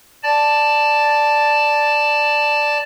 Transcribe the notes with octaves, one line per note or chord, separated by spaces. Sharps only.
D5 A5